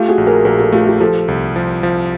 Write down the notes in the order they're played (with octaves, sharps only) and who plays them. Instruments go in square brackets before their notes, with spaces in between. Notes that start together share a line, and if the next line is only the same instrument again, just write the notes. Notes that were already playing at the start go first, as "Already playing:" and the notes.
Already playing: [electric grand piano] A3 [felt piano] F4 G4
[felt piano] F#4 G#4
[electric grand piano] A#1
[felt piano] G#4 A#4
[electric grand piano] A#1 [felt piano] G#4 A#4
[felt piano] G4 A4
[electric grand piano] A3 [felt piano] F4 G4
[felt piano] F4 G4
[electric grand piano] F3 [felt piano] G4 A4
[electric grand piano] C2
F3
F3